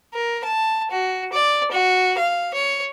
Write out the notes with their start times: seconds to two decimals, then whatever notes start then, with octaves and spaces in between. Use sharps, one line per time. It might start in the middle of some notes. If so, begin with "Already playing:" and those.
0.14 A#4
0.44 A5
0.91 F#4
1.33 D5
1.71 F#4
2.18 F5
2.54 C#5